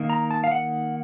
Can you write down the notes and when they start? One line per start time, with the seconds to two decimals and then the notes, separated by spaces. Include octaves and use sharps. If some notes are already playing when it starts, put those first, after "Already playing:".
Already playing: D#3 A#3 D#4
0.10 A#5
0.31 A5
0.44 F5
0.51 F#5